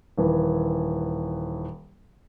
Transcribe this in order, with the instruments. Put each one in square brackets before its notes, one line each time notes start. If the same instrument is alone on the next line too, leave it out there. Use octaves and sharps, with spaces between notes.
[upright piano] D#1 E3